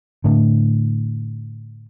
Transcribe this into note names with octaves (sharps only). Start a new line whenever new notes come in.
A2 D3